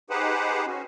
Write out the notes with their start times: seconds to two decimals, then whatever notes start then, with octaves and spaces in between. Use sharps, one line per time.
0.10 D#4 G4 G#4 B4 C5 F#5
0.66 C#4 F#4